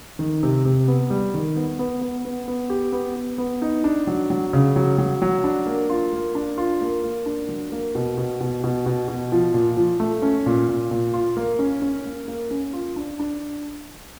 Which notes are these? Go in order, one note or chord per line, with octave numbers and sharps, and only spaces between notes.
D#3
C3
C3
B3
G3
D#3
B3
B3
B3
B3
B3
G4
B3
B3
B3
D#4
D4
F#3
F#3
C#3
F#3
F#3
F#3
D4
A#3
F4
A#3
D4
F4
A#3
A#3
D4
F#3
A#3
B2
B2
B2
B2
B2
B2
F3
A#2
F3
A3
C#4
A#2
A#2
A#2
F4
A#3
C#4
C#4
A#3
A#3
C#4
F4
D4
D4